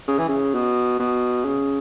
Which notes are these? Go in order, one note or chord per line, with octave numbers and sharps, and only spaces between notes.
C#3
E3
C#3
B2
B2
C#3